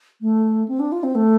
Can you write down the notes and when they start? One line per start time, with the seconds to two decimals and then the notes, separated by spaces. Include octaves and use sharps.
0.21 A3
0.68 C4
0.80 D4
0.92 F4
1.03 C4
1.15 A3